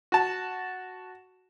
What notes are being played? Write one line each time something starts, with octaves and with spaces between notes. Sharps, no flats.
F#4 A5